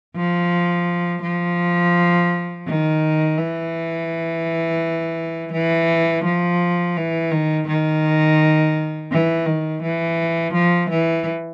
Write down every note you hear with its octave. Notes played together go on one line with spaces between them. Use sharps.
F3
F3
D#3
E3
E3
F3
E3
D#3
D#3
E3
D#3
E3
F3
E3